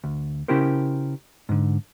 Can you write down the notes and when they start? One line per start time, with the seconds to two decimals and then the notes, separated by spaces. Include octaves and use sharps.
0.04 D2
0.48 C#3 C#4 E4 G4 A#4 C5
1.49 G#2 D3